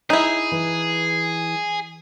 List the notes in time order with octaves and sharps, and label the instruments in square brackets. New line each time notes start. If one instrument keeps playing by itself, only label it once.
[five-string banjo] D#4 E4 [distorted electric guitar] G#4
[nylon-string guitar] E3